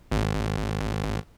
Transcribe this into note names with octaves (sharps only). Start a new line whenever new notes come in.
G#1